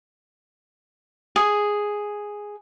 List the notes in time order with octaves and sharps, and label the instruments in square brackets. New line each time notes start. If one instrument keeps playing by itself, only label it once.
[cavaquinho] G#4